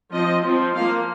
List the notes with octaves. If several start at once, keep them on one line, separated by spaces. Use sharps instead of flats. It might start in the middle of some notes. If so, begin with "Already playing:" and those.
F3 C4 D#5
F3 C4
F3 A#3 F5